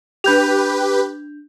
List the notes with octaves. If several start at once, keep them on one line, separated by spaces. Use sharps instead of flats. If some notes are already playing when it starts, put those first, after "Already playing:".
D4 G4 B4 G6 F7